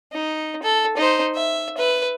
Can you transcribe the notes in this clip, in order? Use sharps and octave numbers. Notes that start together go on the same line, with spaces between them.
D#4
A4
D#4 C5
E5
B4